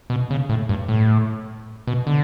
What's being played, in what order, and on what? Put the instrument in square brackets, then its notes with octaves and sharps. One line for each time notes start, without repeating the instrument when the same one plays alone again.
[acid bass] B2
C#3
A2
G2
A2
B2
D3